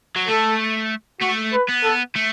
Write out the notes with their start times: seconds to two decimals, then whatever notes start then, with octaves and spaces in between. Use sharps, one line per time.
0.16 F#3
0.28 A3 A4
1.21 A3 F#4
1.53 B4
1.69 B3
1.84 A4
2.15 A3